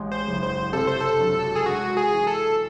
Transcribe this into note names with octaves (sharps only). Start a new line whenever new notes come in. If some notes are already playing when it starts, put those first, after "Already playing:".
Already playing: A1 G#3
C5
F#1
C5
C3 A4
C5
A4
F#3
G#4
G#3 F#4
G#4
E3
A4